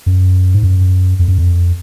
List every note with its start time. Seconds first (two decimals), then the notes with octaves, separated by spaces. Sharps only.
0.06 F#2
0.54 G#2
0.63 F#2
1.19 F2
1.28 F#2
1.38 F2